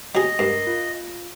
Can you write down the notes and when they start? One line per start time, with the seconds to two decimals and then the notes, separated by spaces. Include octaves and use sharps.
0.15 F#3 G#4 D#5
0.39 G2 A#4 C7
0.67 F4